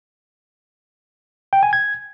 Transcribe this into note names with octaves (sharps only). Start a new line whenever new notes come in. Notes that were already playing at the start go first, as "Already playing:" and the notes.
G5
G#5
G#6